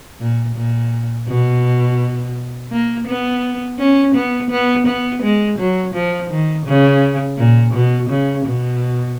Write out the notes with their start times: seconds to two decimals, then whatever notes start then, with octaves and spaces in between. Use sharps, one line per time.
0.20 A#2
0.56 A#2
1.28 B2
2.72 A#3
3.08 B3
3.79 C#4
4.15 B3
4.51 B3
4.87 B3
5.23 G#3
5.59 F#3
5.95 F3
6.31 D#3
6.66 C#3
7.38 A#2
7.74 B2
8.10 C#3
8.46 B2